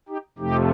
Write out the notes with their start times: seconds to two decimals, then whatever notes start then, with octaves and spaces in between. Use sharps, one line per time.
0.08 D#4 G4
0.38 F2 C3 F3 A3 D#4 G4